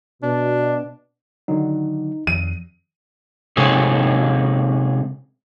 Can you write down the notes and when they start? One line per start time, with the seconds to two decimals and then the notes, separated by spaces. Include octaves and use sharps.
0.23 B2 D4
1.48 D3 D#3 F#3 D#4
2.27 F2 D#3 D#7
3.57 C3 G#3 C#4 D#4 G#4 A4